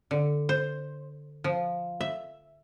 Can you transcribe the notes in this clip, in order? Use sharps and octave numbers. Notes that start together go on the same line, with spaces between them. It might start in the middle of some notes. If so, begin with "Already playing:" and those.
D3
C5
F3
E5